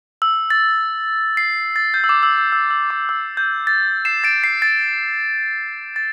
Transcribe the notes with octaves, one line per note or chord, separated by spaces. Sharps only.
E6
A6
C7
A6
G6
E6
D6
E6
E6
E6
E6
D6
E6
G6
A6
C7 E7
A6 D7
C7
A6
A6